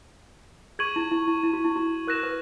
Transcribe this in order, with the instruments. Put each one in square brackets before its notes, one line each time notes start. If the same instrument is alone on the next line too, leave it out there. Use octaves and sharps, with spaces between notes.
[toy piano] G#4 [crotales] C#6 G#6 D#7 F#7
[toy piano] E4
E4
E4
E4
F#4
E4
F#4
[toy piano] A#4 [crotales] F#6 A#6 E7
[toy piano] B4